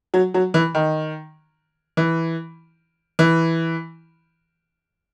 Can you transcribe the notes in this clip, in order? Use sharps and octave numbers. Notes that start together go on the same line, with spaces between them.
F#3
F#3
E3
D#3
E3
E3